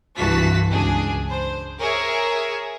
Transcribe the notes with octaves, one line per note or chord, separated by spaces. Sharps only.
C2 G2 E3 F#4 A5 B6
C#2 D4 G#4
C5
G#4 A#4 C#5 E5